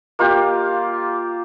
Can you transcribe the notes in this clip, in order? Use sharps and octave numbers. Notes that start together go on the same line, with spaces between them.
A#3 F4 G4